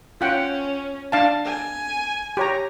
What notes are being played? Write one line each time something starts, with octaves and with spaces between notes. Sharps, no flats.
C#4 F4 F#5 G5
D4 F5 A5
G#5
G4 C#5 A#5